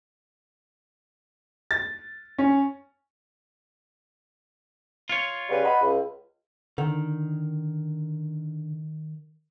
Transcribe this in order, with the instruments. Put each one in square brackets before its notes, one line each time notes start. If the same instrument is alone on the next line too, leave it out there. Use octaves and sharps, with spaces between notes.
[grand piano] A6
C#4
[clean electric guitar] F4 C#5
[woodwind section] C#3 G3 B4
D#5 F#5 B5
C#2
[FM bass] D3 [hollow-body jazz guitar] D#3